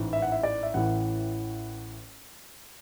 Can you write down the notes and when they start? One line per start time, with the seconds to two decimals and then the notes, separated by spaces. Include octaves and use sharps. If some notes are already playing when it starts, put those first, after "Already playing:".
Already playing: A1 G#2 E3
0.13 E5
0.22 F#5
0.32 E5
0.43 D5
0.63 E5
0.74 A1 A2 E3 F#5